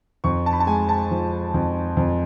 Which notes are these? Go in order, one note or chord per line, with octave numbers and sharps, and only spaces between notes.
F2 C#6
A5
B5
A5
G#3 G#5
A5
F3
F2
F2